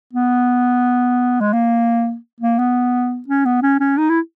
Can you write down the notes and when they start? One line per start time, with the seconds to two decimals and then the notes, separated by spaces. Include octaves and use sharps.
0.13 B3
1.40 G#3
1.53 A#3
2.40 A#3
2.59 B3
3.28 C#4
3.45 B3
3.62 C#4
3.80 C#4
3.98 D#4
4.09 E4